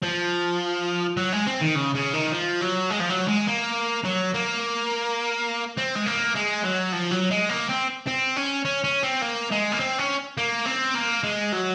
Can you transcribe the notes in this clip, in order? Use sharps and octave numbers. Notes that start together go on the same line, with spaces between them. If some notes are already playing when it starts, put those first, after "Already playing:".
F3
F#3
G#3
C4
D#3
C#3
C#3
D#3
F3
F#3
G#3
F3
F#3
G#3
A#3
F#3
A#3
C4
G#3
A#3
G#3
F#3
F3
F#3
G#3
A#3
C4
C4
C#4
C#4
C#4
C4
A#3
G#3
A#3
C4
C#4
A#3
C4
A#3
G#3
F#3